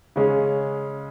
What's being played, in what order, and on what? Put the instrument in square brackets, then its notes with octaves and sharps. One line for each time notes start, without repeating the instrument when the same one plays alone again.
[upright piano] C#3 G#3 C#4 G#4